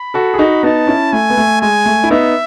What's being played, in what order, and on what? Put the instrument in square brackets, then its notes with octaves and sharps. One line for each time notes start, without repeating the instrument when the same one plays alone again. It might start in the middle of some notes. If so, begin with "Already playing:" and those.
Already playing: [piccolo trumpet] B5
[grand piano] F#4 A4
G#4
D#4 F#4
[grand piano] B3 D#4 [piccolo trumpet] A5
[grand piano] C#4 E4
[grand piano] A3 [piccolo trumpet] G#5
[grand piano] B3
A3
[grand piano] G#3 [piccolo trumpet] G#5
[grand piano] A3
E4
[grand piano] B3 D#4 [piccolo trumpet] E5